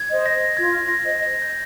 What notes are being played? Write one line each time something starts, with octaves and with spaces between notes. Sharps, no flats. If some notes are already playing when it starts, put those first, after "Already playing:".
Already playing: G#6
C5 D#5
A#6
F4 G#6
A#6
C5 D#5
A#6
G6